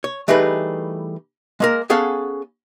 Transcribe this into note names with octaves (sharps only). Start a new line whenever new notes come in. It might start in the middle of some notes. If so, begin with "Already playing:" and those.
C#5
E3 G3 A3 D#4 G#4 B4
G#3 A#3 A#4
B3 C#4 G#4 A4 F5 F#5